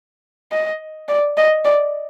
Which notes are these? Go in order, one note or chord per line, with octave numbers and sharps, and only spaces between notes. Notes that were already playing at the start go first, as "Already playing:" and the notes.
D#5
D5
D#5
D5